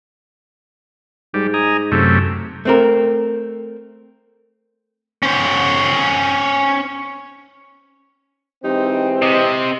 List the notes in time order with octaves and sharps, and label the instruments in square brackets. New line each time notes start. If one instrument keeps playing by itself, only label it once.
[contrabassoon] G#2 [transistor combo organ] G3
[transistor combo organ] D#5 G#5 A#5
F#2 C3 A3
[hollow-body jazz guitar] A3 C4 A#4
[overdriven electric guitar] C#4 C5
[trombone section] E3 G#3 C4 [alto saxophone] D#4 [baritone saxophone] G4
[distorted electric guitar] C3 [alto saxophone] D#5